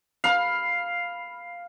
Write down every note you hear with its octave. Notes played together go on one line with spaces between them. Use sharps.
F5 B5